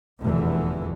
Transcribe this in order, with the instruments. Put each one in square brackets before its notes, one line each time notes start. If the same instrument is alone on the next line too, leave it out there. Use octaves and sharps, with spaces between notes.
[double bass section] F1 E2 G2 B2 D3 E3